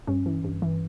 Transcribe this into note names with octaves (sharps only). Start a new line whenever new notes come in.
G2 C#4
E3
G2
E3